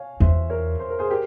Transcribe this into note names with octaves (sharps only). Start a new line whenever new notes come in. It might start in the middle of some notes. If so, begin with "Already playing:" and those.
Already playing: C#5 F5 G#5
E2 C5 E5
A#4 C#5
C5
A#4
G#4 C5
G4 A#4